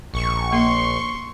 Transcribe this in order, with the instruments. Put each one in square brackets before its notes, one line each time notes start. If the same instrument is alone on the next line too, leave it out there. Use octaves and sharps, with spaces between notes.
[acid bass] A#1 [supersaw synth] C#6
[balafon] A#3 [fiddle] C6